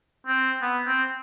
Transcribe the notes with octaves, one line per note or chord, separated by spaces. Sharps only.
C4
B3
C4